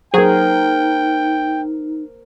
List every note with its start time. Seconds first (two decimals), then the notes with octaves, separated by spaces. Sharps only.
0.14 F#3 D#4 G#4 A#4 C5 G5